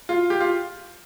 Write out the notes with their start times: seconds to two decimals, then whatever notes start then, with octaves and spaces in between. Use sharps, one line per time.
0.09 F4
0.30 G4
0.40 F4